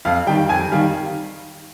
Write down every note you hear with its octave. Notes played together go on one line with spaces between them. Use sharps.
F2 F5
D#3 G3 G5
F2 G#5
D#3 G3 F5